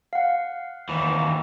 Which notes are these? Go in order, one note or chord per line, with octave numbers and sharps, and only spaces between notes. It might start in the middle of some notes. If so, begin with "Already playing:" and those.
F5 F#5
D#2 E3